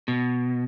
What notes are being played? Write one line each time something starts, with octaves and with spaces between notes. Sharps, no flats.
B2